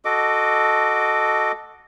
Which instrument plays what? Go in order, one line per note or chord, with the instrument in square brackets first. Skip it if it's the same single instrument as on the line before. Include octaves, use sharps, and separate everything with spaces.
[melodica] F#4 A4 D#5 D6